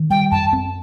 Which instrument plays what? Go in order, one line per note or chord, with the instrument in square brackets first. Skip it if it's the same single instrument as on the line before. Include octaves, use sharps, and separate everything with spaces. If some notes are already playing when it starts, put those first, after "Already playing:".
Already playing: [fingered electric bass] D#3
[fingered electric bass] G3 [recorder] G5
[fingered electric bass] F#2 [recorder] A5
[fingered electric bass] C4